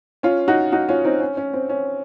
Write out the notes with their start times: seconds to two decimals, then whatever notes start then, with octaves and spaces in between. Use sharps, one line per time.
0.23 C#4 F4
0.48 D#4 F#4
0.72 D#4 F#4
0.89 C#4 F4
1.05 C4 D#4
1.21 C#4
1.37 C#4
1.53 C4
1.69 C#4